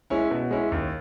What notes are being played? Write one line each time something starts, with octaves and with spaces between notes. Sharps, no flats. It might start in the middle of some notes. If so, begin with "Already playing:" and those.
G#3 C#4 E4
B2
G#3 C#4 E4
D#2